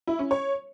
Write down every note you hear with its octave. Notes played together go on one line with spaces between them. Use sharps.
E4
C#4
C#5